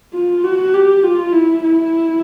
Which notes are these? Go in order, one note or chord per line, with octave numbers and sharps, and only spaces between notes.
F4
F#4
G4
F4
E4
E4